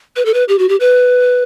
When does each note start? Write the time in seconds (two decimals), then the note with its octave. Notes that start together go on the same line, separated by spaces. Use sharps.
0.16 B4
0.25 A4
0.34 B4
0.49 G4
0.59 F#4
0.69 G4
0.80 B4